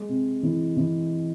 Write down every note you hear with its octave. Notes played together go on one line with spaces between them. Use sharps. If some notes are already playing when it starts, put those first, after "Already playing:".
Already playing: G#3
C3
E3
E3